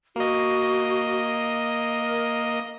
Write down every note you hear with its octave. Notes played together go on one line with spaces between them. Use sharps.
A#3 F#4 D#5
A#4